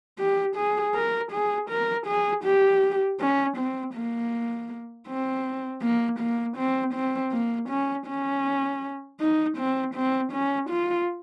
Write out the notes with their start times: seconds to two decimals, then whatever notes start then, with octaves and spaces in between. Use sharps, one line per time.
0.19 G4
0.56 G#4
0.95 A#4
1.32 G#4
1.70 A#4
2.07 G#4
2.44 G4
3.20 C#4
3.57 C4
3.94 A#3
5.07 C4
5.82 A#3
6.20 A#3
6.57 C4
6.94 C4
7.32 A#3
7.69 C#4
8.07 C#4
9.20 D#4
9.57 C4
9.94 C4
10.32 C#4
10.70 F4